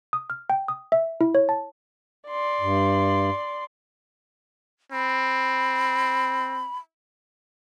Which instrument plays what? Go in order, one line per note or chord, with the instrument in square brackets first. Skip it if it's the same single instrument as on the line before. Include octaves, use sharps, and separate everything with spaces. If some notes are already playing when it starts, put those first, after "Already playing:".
[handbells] D#6
F6
G5
D#6
E5
E4
C#5
A5
[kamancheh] D5 C6
[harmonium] G2
[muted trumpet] C4 [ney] B5